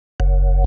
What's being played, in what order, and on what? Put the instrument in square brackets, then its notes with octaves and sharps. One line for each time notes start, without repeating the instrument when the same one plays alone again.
[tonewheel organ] F#1